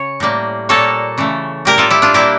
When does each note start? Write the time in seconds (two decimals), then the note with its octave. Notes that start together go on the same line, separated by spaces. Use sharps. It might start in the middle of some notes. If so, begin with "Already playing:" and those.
Already playing: C#3 C#5
0.20 A2 G3 A#3
0.69 A#2 G3 A#3 A4 C#5
1.18 C#3 E3 A3
1.65 A2 G3 A#3 G4 A#4
1.78 F4 A4
1.91 E4 G4
2.02 D4 F4
2.14 A#2 G3 A#3 E4 G4